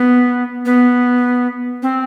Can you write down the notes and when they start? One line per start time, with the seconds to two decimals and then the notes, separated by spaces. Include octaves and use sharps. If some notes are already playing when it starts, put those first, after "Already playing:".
Already playing: B3
0.65 B3
1.83 C4